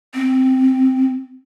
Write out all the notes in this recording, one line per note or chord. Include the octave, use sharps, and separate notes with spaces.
C4